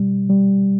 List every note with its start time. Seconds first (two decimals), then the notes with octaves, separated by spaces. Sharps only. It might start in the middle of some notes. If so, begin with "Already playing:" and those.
Already playing: B2 G3
0.30 G3